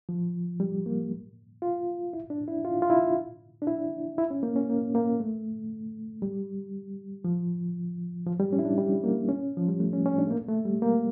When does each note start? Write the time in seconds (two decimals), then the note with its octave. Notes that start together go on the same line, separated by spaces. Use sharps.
0.09 F3
0.60 G3
0.86 A#3
1.62 F4
2.13 E4
2.30 D4
2.48 E4
2.65 F4
2.82 F4
2.90 E4
3.62 D4
3.67 E4
4.18 E4
4.31 C#4
4.43 A#3
4.56 C#4
4.69 A#3
4.95 A#3
5.20 A3
6.22 G3
7.25 F3
8.26 F3
8.40 G3
8.53 C#4
8.59 E4
8.65 D4
8.78 G3
9.04 A#3
9.29 C#4
9.57 F3
9.69 G3
9.80 A3
9.93 C#4
10.06 C#4
10.18 D4
10.27 A3
10.31 A#3
10.48 A3
10.65 G3
10.82 A#3